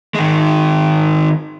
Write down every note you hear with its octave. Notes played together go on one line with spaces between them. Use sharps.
D#3 G#3